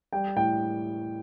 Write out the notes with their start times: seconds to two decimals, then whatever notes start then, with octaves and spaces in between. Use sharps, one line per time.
0.13 G3 G5
0.36 A2 G5